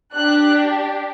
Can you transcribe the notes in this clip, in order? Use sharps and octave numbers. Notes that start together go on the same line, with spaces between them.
D4 G4 F#6